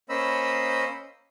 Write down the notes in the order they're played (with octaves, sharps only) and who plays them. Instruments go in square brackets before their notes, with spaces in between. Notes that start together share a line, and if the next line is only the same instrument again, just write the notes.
[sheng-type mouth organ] A#3 C#4 C5 D#5 B5 E6